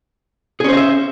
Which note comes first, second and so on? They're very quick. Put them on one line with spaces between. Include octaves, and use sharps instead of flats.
G#4 C#4 C5 D#5 E5